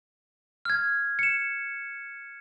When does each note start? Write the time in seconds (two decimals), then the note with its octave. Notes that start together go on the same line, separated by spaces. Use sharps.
0.65 F6 G#6
1.19 C#7 E7